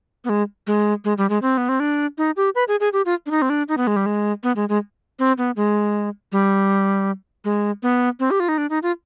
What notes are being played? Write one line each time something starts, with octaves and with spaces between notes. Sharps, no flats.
B3
G#3
G#3
G#3
G3
G#3
C4
B3
C4
D4
D#4
G4
B4
G#4
G#4
G4
F4
D4
D#4
C4
D4
D#4
B3
G#3
G3
G#3
B3
G#3
G#3
C4
B3
G#3
G3
G#3
B3
C4
G4
F4
D#4
D4
D#4
F4